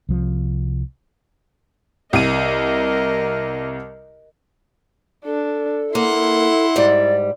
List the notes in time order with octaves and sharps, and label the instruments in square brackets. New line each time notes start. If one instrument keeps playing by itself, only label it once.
[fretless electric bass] C2 F3
[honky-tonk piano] C2 D#7 [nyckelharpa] A#4 D#5
[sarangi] D4 [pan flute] A4
[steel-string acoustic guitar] A#3 [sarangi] E4 [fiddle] F#5 C6
[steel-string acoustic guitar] G#2 G3 [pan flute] D5